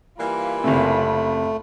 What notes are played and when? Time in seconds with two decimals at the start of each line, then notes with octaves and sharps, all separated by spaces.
0.18 E3 G3 A#3 F4 B5
0.64 F#1 C3 A3